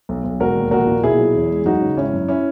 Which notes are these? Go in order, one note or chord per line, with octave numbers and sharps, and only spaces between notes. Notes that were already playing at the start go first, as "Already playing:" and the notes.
B1
B1
E1 F#4 A#4
D#2
A#1 F#4 A#4
A#2
B2 E4 G#4
F#3
E2
G#3
F#2 D#4 F#4
C#3
G#1 C#4 E4
F#2
C#4 E4